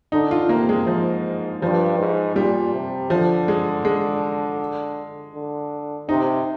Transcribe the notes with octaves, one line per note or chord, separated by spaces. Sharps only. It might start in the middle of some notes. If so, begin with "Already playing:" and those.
D3 D#4
F4
C3 A#3
G#3
G#2 F3
G2 F3
G#2
A#2 G3
C3
D3 F3
G#3
G#3
D3
C3 D#4